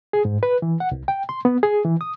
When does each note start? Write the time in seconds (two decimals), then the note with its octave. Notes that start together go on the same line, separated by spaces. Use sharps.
0.13 G#4
0.25 G#2
0.43 B4
0.62 E3
0.80 F#5
0.92 C2
1.08 G5
1.29 C6
1.45 B3
1.63 G#4
1.85 E3
2.01 D#6